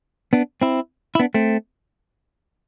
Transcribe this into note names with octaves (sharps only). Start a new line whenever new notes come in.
B3 D4
C4 E4
E4
B3 D4
A3 C4